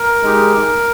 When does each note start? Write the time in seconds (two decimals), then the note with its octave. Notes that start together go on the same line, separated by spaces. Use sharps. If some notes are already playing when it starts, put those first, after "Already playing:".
Already playing: A#4
0.23 G#3 D#4 G4